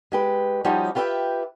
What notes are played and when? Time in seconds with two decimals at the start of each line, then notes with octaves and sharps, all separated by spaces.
0.12 G#3 G4 B4
0.64 F3 G3 C#4 D#4 F#4 G4
0.95 F4 G4 B4 C5 E5 G5